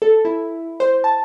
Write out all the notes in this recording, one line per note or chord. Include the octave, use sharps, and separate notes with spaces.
A4
E4
C5
A5